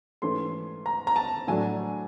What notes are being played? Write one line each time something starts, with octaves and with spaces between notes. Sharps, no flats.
G#2 E3 A3 C#4 C6
A#5
A#5
A5
A2 F#3 A3 D4 G#5